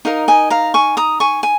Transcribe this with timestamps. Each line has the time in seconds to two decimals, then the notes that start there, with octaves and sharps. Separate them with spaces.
0.05 D#4 A#4 D#5 F5
0.28 D#5 G#5
0.50 F5 A#5
0.74 G#5 C#6
0.97 A#5 D#6
1.20 G#5 C#6
1.43 G#5